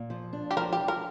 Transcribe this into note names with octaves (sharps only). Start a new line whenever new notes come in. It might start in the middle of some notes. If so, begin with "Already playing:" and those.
Already playing: A#2
F3
D4
G4
F3 A#4
G4
F3
A#4